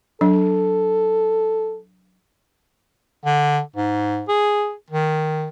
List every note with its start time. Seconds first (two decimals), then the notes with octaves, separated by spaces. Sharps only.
0.21 F#3 D4 A4
3.25 D3
3.76 G#2
4.28 G#4
4.90 D#3